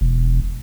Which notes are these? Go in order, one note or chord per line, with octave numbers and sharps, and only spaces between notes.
E1